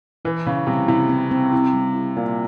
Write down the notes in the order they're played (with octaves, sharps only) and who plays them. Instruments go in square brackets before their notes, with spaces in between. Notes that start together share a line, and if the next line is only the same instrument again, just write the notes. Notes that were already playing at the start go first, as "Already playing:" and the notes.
[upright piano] E3 [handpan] E4
[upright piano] C#3 [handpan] E4
[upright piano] C3 [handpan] G3
[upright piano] C3 [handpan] E4
[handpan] C4
C4
E4
G3
E4
[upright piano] A#2 [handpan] C4